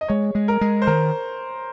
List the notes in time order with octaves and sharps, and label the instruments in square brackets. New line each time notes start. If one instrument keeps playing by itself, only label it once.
[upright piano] D#5
[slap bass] G#3 [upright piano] C#5
[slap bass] G#3
[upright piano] A#4
[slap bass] G#3
[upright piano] C5
[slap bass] D#3 [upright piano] A#4